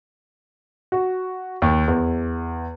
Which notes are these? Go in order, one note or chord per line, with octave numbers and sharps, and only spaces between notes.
F#4
D#2
E2